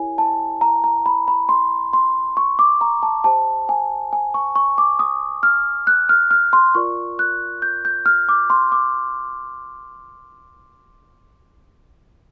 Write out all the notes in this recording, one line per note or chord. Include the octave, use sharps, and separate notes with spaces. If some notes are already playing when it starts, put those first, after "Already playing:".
Already playing: E4 G4 A#4 C#5 G#5
A5
A#5
A#5
B5
B5
C6
C6
C#6
D6
A#5
A5
G4 C5 A5
G#5
G#5
C#6
C#6
D6
D#6
F6
F#6
F6
F6
C6
F4 A#4 D5 C#6
F#6
G6
G6
F6
D6
C6
D6